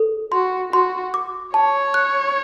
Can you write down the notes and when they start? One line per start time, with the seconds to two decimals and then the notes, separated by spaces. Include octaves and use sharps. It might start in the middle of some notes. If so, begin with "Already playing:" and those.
Already playing: A4
0.32 F#4 C6
0.73 F#4 C6
1.14 D6
1.54 C#5 A5
1.94 F#6